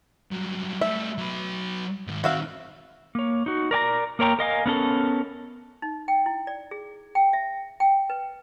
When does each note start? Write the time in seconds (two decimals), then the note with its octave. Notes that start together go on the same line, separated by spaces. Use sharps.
0.31 G2 F#3
0.81 G3 A3 E5
1.18 F#3 B4
2.07 G#2 D#3
2.24 D#3 C4 F#4 E5 F5
3.15 A#3 C#5
3.46 D#4 F#4
3.71 A#4 D5 G#5 A#5
4.19 A#3 A#4 C#5 G5 A#5
4.39 A#4 D#5 F5 G#5
4.66 B3 C#4 A4 A#4
5.82 D#4
6.08 G5
6.26 E4
6.47 D5
6.71 G#4
7.15 G5
7.33 E5
7.80 G5
8.10 B4